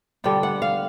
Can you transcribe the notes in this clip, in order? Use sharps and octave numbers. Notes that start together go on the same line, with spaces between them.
D3 G3 B3 G5
F#5
F5